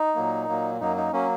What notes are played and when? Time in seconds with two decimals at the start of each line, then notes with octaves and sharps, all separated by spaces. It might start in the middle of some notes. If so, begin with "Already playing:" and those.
Already playing: D#4
0.15 A#2 F#3 A#3
0.48 A#2 F#3 A#3
0.80 F#2 F#3 A#3 D#4
0.97 D#4
1.12 F#3 A#3 C#4